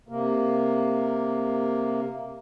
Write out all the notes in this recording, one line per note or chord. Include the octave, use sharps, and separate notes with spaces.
C3 A#3